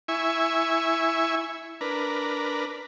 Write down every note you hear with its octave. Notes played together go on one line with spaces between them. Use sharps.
E4 E5 G#5 C#6
D4 A#4 B4